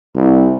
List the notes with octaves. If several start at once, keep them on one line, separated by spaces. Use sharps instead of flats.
C2